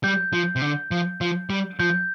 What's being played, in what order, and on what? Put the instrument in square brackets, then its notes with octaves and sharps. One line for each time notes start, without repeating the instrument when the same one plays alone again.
[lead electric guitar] G3 [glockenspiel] G6
[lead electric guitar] F3
C3
D3
F3
F3
G3
[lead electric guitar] F3 [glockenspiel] G6